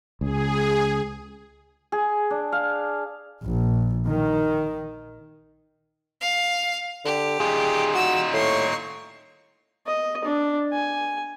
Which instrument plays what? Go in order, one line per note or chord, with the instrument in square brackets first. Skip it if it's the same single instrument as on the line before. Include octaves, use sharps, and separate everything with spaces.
[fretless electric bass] C#2 [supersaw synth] G#4
[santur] G#4
D4
F5
[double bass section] A#1
D#3
[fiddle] F5
[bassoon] D3 [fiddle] G4
[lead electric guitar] D#4 F4 [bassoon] G#4
[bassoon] F#4 [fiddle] E6
[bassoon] A2 [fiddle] C6 C#6
[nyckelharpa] D#5
D4
G#5